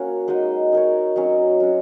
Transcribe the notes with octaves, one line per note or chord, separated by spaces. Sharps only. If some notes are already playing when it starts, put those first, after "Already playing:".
Already playing: A#3 C#4 F#4
G#3 D#4 F#4 D#5
D#4 A#4 C#5
F#3 C#4 A#4 D#5
F#3 C#4 F#4